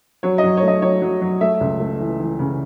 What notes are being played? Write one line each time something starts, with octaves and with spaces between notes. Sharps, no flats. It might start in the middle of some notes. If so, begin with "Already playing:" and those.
F#3 C#5
D#5
F#3
A3 C#5
D#5
F#3 C#5
F#3
F#3
A3 E5
C#2
A3
E3
E3
C#3